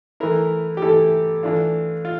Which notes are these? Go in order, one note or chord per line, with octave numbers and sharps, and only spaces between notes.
E3 A3 E4 A#4
G4
E3 A3 E4 A4
E3 A3 D4 F4
F4